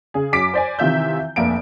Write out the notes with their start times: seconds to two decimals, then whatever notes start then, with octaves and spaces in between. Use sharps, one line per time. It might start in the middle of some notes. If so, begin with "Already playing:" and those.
0.14 C#3 G#4
0.33 F#2 D6 B6 D7
0.54 C5 D5 G#5
0.79 C3 D#3 E3 F4 E5 G6
1.36 F1 A#1 A#3 E5 D7